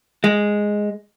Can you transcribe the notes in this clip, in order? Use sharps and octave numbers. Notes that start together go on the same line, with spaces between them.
G#3